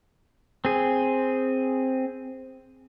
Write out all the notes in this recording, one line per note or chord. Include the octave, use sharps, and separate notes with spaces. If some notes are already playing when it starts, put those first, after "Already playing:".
C4 G#4